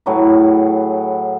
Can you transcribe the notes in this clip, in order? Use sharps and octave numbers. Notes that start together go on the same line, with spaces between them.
A2 F#3 G#4 B4